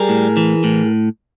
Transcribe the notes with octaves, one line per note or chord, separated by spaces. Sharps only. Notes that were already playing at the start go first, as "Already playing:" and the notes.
Already playing: G3 G#4 A#4
A2
E3
A2